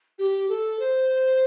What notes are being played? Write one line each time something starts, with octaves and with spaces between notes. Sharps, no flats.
G4
A4
C5